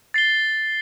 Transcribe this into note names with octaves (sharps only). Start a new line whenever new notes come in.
A6 C7 G7